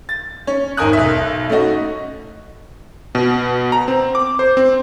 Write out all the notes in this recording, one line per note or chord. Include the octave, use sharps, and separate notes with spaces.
A6
C#4 C#5
G#1 D#3 A#4 G#5 D#6 F#6
B1 E5
A3 C#4 D#4 F#4
B2
A#5
C4
D6
C5
C4